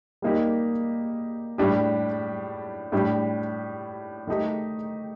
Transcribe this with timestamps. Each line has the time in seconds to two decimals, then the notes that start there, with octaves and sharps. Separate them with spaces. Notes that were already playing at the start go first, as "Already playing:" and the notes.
0.22 G3 A#3 D#4 G4
1.58 A2 G3 D4 G4
2.92 A2 G3 D4 G4
4.27 D#3 A3 D#4 G4